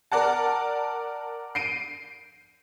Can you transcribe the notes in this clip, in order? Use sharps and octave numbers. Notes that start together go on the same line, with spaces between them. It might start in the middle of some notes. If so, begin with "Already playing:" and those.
A#4 D5 F#5 A5
C7 D7 D#7